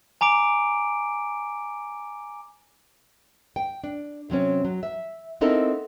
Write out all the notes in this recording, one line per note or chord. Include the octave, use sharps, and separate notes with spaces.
G#5 A#5 D6 D7
G5
D4
C3 F#3 C4 C#4
F#3
E5
B3 C4 D#4 E4 A4 A#4